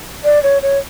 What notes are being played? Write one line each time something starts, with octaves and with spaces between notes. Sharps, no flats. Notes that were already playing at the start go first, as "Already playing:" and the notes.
D5
C#5
C#5